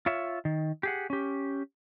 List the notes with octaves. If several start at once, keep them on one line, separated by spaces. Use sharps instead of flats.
F4 C#5 E5
D#3
G4 G#4 F#5
C#4 G4